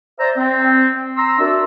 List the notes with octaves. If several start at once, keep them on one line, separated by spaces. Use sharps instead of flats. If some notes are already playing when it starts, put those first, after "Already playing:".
C5 D5 E5 A#5
C4
A#5 C6 E6
D4 F#4 A#4 D5 E5